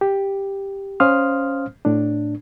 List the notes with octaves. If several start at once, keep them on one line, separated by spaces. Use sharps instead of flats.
G4
C#4 C5 F5 C6 D#6 F6
A2 D4